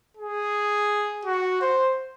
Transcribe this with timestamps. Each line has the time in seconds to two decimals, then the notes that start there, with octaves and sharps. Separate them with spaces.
0.17 G#4
1.25 F#4
1.61 C5